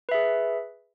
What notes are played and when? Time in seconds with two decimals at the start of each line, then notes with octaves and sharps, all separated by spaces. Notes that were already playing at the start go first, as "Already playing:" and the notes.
0.09 B4
0.12 E5
0.14 G#4